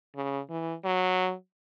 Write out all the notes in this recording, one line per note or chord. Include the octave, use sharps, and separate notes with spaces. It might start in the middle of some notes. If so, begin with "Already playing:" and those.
C#3
E3
F#3